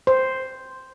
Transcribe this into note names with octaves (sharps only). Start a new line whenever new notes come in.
C5